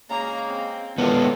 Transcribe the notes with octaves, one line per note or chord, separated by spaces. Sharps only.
C#3 G#3 A#3 A#5
C4
A2 D#3 G#3 B3 D4 F4